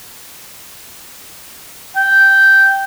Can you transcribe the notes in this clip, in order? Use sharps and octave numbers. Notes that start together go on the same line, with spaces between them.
G5